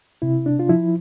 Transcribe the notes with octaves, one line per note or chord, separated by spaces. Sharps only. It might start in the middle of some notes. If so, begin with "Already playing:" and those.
C3 E4
D4
F4
F3 E4